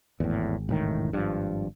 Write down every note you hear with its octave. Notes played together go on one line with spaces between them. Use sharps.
G#1 E2 A2
E1 A2 D#3
G2 F3